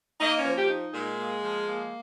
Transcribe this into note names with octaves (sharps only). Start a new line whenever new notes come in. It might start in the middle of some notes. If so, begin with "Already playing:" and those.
A#3 D#4 D#5
C#4 C#5
F3
G4
D#4
A#2 G#3 G#4
A#3
F3
A#3